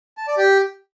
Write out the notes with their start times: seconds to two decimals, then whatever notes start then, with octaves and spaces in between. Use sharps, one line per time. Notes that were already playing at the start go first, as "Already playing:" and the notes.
0.18 A5
0.27 D5
0.37 G4